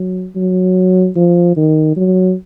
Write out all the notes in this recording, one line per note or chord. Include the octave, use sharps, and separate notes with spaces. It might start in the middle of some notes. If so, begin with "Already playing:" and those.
Already playing: F#3
F#3
F3
D#3
F#3